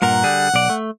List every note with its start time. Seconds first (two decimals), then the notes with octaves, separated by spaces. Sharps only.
0.02 G2 A#2 A#4 F#5
0.23 D3 G3 G#4
0.54 B1 D5
0.70 A3